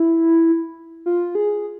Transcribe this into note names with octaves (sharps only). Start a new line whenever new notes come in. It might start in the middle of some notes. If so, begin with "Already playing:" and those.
Already playing: E4
F4
G#4